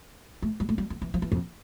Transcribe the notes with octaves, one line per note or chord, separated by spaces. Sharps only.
A3
G3
A3
G3
F3
E3
F3
E3
F2